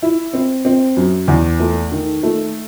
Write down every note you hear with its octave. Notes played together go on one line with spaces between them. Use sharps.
E4
C4
C4
F#2
E2
A3
D#3
A3